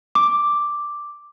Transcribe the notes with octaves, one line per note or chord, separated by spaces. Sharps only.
D6